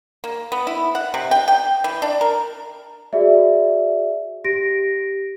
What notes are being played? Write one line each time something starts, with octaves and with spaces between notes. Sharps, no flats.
A#3
B3
E4
F#5
C3
G5
G5
E3
D4
A#4
F#4 G#4 D5 E5
G4 A#6 D7